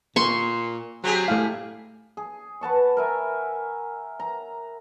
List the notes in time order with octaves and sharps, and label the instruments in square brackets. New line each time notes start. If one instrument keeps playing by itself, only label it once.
[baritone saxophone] A#2 [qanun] C6 C#6
[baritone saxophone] F#3 [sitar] C4 G4 G#4
[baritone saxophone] A2 [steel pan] A3 F5
[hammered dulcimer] G#4
B4 F#5 A5 C#6
A#4 E5 G#5
A#5